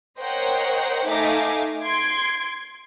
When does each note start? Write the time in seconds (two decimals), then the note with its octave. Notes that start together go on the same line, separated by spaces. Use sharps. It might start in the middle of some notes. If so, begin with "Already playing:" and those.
0.20 A#4 C5 C#5 D#5 F#5 G5
1.07 A3 D#4 E5 F5 G#5 D6
1.83 C6 G#6 D7